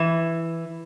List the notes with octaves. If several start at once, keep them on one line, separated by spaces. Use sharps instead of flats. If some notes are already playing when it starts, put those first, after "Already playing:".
Already playing: E3